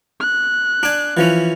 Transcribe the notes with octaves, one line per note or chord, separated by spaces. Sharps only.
F#6
D4 G#5
E3 F3 C#4